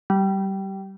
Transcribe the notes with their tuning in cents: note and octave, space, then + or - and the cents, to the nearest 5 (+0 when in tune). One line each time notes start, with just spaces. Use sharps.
G3 -15